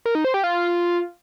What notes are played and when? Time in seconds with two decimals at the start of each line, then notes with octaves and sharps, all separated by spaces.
0.06 A#4
0.15 D#4
0.25 C5
0.34 G4
0.44 F4